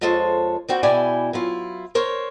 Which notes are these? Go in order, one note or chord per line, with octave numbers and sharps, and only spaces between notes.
F2 G#3 F4 A4 C5 C#5
G3 C4 F#4 G5
B2 E4 G#4 D5 G5 G#5
F#3 E4 F4
A#4 C5 C#5